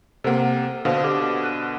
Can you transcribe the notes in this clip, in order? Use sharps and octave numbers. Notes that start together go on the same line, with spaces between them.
C3 A#3 A4 C5 F#5
B2 D3 C5 F5
G4 A4 D6
F#6 D#7